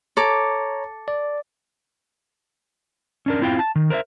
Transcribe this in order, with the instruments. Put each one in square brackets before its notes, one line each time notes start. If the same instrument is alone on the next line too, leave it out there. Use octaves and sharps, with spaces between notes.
[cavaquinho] A4 D6 [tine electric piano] C#5 A#5
[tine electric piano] D5
[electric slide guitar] C#4 D4 A#4
C4 E4 F4 F5 G5
A5
D#3
A#4 C5 D5 E5